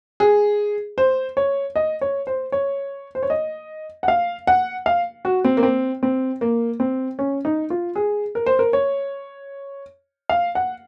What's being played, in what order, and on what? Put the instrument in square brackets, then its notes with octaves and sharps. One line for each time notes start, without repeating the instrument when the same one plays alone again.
[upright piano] G#4
C5
C#5
D#5
C#5
C5
C#5
C5
C#5
D#5
F#5
F5
F#5
F5
F#4
C4
A#3
C4
C4
A#3
C4
C#4
D#4
F4
G#4
A#4
C5
A#4
C#5
F5
F#5